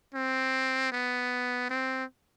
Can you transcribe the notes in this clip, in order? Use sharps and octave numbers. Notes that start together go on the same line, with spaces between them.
C4
B3
C4